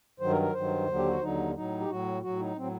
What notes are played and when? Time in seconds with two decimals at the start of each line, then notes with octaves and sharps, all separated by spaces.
0.20 G2 D#3 F#3 C5
0.31 A#4
0.42 A#4
0.53 G2 D#3 F#3 C5
0.87 D#2 D3 F#3
0.96 G4
1.08 F#4
1.21 D#2 D3 F#3 D#4
1.54 A2 F#3 D#4
1.80 G4
1.88 A2 F#3 F#4
2.22 A2 F#3 F#4
2.39 D#4
2.56 A2 F#3 C4